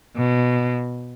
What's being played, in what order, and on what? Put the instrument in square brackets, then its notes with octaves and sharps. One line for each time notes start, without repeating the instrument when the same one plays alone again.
[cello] B2